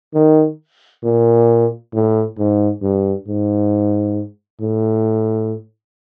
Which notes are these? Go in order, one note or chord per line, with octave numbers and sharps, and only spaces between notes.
D#3
A#2
A2
G#2
G2
G#2
A2